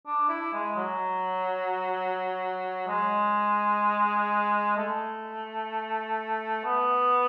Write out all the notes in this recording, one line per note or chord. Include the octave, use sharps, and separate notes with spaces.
D4
E4
G#3
F#3
G#3
A3
B3